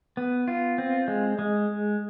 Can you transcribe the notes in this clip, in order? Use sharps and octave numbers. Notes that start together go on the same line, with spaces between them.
B3
F4
C4
G#3
G#3